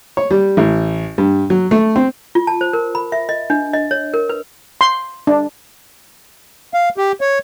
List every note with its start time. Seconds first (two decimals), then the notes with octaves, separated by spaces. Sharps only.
0.17 C#5
0.31 G3
0.57 A1
1.18 G2
1.50 F#3
1.71 A3
1.96 C4
2.35 F4
2.47 A5
2.61 C5
2.73 A#4
2.95 B5
3.12 E5
3.29 D#5
3.50 D4
3.74 D#5
3.91 C#5
4.14 A#4
4.29 B4
4.81 C6
5.27 D4
6.74 F5
6.97 G4
7.21 C#5